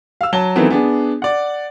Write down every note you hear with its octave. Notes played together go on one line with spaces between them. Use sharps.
F5 E6
F#3 A5 G7
D#3 E3 F#3 A3 B3 C4
B3 D4 G#4
D5 F#5